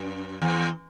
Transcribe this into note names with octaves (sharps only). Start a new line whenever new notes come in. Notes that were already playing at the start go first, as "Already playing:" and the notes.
Already playing: F#2
E2